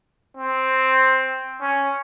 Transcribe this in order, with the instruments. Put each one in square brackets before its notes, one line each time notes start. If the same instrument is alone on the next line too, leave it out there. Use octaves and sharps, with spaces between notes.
[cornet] C4
C#4